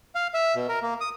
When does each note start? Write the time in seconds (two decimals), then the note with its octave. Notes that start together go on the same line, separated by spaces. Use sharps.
0.15 F5
0.34 E5
0.55 B2
0.69 A#4
0.82 A#3
1.01 D#6